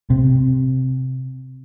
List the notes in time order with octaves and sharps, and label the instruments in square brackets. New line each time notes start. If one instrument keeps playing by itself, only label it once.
[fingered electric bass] C3